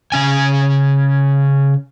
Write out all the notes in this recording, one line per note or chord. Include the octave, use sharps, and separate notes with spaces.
C#3 C#4 G#5